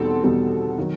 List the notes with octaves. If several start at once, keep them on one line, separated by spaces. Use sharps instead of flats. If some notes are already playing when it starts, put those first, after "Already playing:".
Already playing: E2 B2 G3 C4 D#4 A4
E2 B2 G3 C4 D#4
D#3 F#3